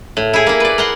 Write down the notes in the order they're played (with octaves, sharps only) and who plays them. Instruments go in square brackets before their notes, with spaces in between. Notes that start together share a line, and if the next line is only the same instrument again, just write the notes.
[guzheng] A2
E4 G#4
A#3 E4
B4 D5
A#4 F#5 C6